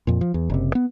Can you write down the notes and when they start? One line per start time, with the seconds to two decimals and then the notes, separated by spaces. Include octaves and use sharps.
0.07 F2 A#2
0.21 F3
0.34 E2
0.50 F#1 C3
0.75 B3